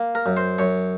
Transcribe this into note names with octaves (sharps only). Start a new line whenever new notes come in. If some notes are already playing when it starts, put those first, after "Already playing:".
Already playing: A#3
A#4
F#2
C5
F#2 C#5